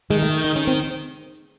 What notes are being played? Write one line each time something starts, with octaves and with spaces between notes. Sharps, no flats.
D#3 G#3
A3
D#4
D#3 C#4
C4